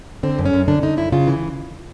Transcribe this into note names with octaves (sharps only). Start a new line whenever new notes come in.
D3 C4
F#2
C#4
F#2
D3 D4
D3 D#4
F#2 E4
C#3 F4
E3